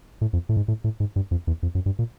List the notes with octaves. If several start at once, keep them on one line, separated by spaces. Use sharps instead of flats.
A2
F2
A2
G#2
A2
A2
G#2
G2
F2
E2
F2
F#2
G2
A#2